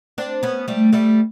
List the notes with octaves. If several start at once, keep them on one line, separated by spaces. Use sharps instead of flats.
C4 D4
B3 C#4
G3 A3
G3 A3